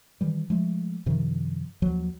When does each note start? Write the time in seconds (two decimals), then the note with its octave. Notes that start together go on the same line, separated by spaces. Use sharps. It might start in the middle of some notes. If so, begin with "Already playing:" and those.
0.21 D#3 E3 G3
0.50 F3 G#3 A3
1.06 F#2 C3 D#3 F3
1.82 D#2 F3 F#3